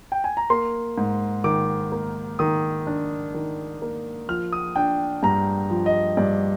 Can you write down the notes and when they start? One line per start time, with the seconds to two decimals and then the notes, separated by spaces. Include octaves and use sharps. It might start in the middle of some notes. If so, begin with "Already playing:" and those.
0.12 G5
0.24 G#5
0.37 A#5
0.50 A#3 C6
0.98 G#2
1.44 D#3 D6
1.92 A#3
2.39 D#3 D#6
2.87 D4
3.34 D#3
3.82 A#3
4.29 F3 F6
4.53 D#6
4.76 D4 G5
5.23 G2 A#5
5.70 F3
5.86 D#5
6.17 G2 D5